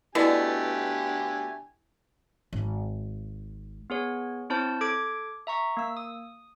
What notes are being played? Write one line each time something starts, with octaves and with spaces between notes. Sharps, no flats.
B2 D3 A3 E4 G4 D5 G#5
G#1
B3 G#4 C#5
C4 E4 C5 C#5 A5 G6
A4 D6 G#6 D7
E5 A#5 C#6
A#3 E6
D#6